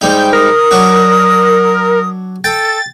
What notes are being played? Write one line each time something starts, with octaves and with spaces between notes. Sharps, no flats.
G#2 G3 D#4 G5 G6
A#4 D#6
F#3 D4 F#4
A4 G5 A6